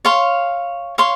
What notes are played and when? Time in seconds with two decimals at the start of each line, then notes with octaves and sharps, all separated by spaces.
0.05 C#5 F5 C6
0.98 C#5 F5 C6